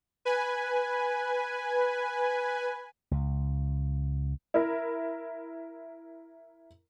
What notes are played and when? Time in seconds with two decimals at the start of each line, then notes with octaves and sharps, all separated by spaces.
0.25 B4 G#5
3.11 C#2
4.54 E4 A#4